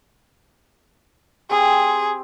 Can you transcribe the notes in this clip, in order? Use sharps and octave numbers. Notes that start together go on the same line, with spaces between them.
C4 G4 G#4